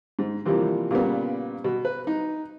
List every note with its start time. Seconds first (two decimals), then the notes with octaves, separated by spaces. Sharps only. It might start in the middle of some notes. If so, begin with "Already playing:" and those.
0.19 G#2
0.46 C3 E3 F3 G3 A#3
0.91 A#2 C#3 G3 B3
1.64 B2
1.85 B4
2.07 D#4